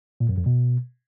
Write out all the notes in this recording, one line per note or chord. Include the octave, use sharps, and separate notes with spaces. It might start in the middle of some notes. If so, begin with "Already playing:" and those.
A#2
F#2
F2
B2